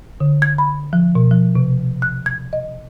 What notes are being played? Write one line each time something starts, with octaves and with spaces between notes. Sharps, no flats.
D3
G#6
B5
F3
B2
F3
C3
F#6
G#6
D#5